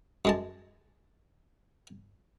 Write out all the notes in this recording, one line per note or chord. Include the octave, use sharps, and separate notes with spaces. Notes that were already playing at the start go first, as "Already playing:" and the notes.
F#2 G#3 A5